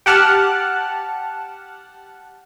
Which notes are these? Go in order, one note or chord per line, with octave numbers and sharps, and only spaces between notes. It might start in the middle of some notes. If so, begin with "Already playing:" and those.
G4 F#5 A5 F6 F#6